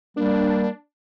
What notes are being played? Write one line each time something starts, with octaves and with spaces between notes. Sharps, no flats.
G3 A#3 D4